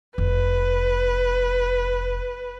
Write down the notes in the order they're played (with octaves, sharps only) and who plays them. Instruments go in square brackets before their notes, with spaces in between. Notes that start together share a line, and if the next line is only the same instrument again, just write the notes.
[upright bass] F1 [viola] B4